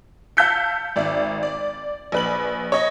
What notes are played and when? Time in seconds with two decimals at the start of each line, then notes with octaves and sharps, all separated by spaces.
0.37 F5 A5 E6 G6 B6 C#7
0.96 G#1 D5 E5
1.43 D5
2.12 A#1 B4 F#7
2.72 C#5 D#5